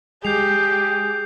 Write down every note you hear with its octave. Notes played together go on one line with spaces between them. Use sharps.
G#3 G4 G#4 G6 C7 F7